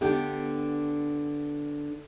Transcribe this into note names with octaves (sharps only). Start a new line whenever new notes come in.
D3 B3 D4 G4